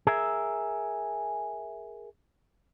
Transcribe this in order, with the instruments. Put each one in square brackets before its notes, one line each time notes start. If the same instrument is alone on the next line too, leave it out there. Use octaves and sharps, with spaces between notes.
[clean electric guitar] G#4 A#4 E5